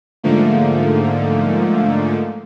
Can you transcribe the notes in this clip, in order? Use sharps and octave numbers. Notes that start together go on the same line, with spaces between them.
G#2 D3 F3 A3 A#3